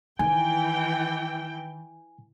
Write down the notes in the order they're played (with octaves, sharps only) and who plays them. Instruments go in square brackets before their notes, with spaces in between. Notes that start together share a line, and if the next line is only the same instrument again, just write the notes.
[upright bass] D#3 [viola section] E3 G5 [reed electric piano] G#5